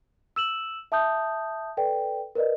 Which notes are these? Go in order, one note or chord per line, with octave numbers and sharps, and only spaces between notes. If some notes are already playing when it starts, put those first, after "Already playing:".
E6 E7 F#7
E5 A5 D#6 G6
A4 B4 D5 G5
A#4 B4 D5 D#5